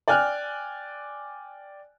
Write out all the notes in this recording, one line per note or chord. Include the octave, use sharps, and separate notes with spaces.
D5 G5 G#5 F6 F#6